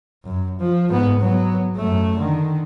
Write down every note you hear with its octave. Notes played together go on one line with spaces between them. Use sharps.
F#2
F3
G#2 B3
F#3 B3
F#2 A3
D3 D#3